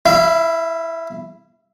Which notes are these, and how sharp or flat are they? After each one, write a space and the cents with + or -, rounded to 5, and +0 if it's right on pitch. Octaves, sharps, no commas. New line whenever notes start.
E4 +0 F5 -40